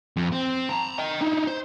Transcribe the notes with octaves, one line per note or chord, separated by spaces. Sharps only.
F2
C4
A5 A#5
D#5 G5
D#4 E4
C5